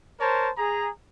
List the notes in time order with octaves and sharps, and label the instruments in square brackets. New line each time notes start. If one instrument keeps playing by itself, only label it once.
[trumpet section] A#4 C5 C#5 A5
G#4 A#5